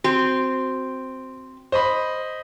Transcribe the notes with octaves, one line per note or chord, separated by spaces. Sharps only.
C4 F#4
C5 D#5 B5